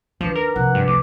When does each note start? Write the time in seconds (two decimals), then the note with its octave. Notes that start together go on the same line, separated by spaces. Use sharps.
0.21 D#2 F3 D4 B4
0.35 A#4
0.56 C3 F3 F#5
0.75 G2
0.87 D2 D6